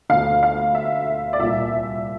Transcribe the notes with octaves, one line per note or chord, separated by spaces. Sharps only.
D2 D3 F5
F5
E5
D5
C2 A#2 E5